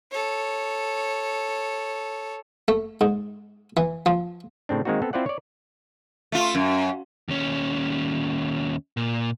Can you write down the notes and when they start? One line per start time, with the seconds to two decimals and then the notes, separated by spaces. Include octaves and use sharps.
0.11 A4 C#5
2.68 A3
3.01 G#2
3.77 E3
4.06 F3
4.69 A2 C#3 C4 D4
4.85 D#3 G#3 A#3 C4 D#4 F#4
5.02 B3 C4 A4
5.13 C4 E4 F4 C5 D5 F#5
5.26 C#5 D5
6.32 A3 F4
6.55 F#2
7.29 D#2 C#4
8.97 A#2